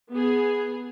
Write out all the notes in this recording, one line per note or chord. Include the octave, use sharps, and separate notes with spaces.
B3 G#4